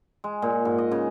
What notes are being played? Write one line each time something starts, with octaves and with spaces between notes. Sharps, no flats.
G#3
A#2
G#2
D#5
C#3